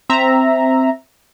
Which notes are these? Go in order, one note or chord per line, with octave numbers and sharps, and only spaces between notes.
C4 E5 A#5